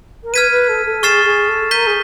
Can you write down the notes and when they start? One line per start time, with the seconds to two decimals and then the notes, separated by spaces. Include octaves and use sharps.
0.24 A#4
0.33 B4 F6 G#6 B6 D#7
0.50 B4
0.69 A4
0.86 A4
1.02 G#4 C#6 F6 A6 C7 E7
1.25 G#4
1.49 A4
1.71 A#4 G6 B6 D#7 G7
1.87 G#4